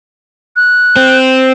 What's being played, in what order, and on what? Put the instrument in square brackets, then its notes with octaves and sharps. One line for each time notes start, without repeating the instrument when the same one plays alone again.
[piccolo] F#6
[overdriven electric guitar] C4